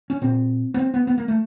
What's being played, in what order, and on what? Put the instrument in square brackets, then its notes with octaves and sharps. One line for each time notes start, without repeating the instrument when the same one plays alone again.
[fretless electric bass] C#4
A#2 C4
B3
C4
B3
B3
A#3
A3